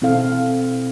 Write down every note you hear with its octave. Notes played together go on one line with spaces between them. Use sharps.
B2 C4 E4 A4 F5